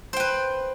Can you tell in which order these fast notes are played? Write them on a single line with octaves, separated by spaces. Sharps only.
C5 G5 B4